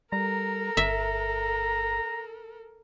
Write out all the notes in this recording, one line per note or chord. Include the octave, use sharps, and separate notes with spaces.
G3 A4 A#4 A#5
G1 E5